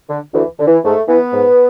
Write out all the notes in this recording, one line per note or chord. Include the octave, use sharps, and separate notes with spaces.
D3
D2 E3
D3
E3
G#2 A3
E3 B3
G#2